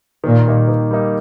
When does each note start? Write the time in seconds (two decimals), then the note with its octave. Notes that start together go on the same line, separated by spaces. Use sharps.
0.24 A#2 D#3
0.46 G3 A#3 D#4
0.68 D#3
0.91 G3 A#3 D#4